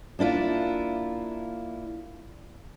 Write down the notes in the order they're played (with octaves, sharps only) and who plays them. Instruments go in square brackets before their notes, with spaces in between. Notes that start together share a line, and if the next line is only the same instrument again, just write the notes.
[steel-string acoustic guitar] A#3 D4 E4 F4